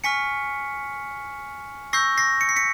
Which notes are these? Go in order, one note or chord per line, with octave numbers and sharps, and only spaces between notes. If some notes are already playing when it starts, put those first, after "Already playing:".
G#5 C#6 F6 B6 C#7
C#6 E6 G6 A#6 C7
A#6 C7
C#7
C7
B6 C#7